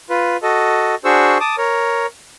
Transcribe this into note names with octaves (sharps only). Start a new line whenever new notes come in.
F4 B4
F#4 A4 D#5
D4 F#4 G#4 C5 C#6 E6
A5 D6 D#6
A#4 C#5